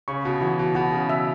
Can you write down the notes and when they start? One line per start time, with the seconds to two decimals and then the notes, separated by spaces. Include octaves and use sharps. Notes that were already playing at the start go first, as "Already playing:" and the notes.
0.08 C#3 C#6
0.25 B2
0.41 E3 F#4
0.59 B2
0.75 B2 F#4
0.92 C#3
1.10 E5